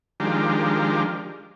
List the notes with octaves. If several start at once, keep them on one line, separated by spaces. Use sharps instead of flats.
D#3 F3 G#3 D4 G4 A#4